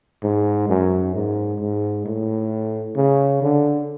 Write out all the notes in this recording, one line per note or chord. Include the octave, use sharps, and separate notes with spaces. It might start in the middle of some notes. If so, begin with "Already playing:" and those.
G#2
F#2
G#2
G#2
A2
C#3
D3